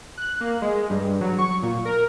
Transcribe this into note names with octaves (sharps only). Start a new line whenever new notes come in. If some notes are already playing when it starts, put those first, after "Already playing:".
F#6
A#3
G#3
G2
F#3
C#6
A#2
A#4